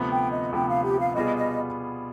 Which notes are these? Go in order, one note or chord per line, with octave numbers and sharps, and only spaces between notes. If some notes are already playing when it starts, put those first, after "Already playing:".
Already playing: D2 C3 F3 B3
G5
D#5
D2 C3 F3 B3 G5
F5
G4
F5
B2 G3 B3 F4 G#4 D#5
D#5